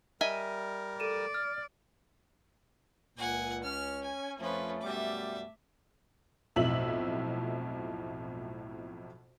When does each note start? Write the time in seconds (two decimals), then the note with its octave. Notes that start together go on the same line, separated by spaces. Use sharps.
0.21 G3 A#4 D#5 E5 G#5
1.00 A4 D5 D#7 E7
1.34 F6
3.17 C#2 A#2 F#5 G#5
3.63 C#4 F6
4.02 G#5
4.39 F2 F3 A3 C#4 B4
4.82 F#2 B2 G3 E5 D6
6.56 B1 F2 A2 E5 F#7